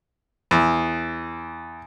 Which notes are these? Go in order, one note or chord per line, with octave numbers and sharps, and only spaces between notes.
E2